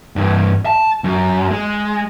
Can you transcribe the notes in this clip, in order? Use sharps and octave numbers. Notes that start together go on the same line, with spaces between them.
G2 E3
A5
F#2
G#3